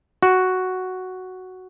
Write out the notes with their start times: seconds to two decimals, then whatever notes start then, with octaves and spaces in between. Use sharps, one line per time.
0.23 F#4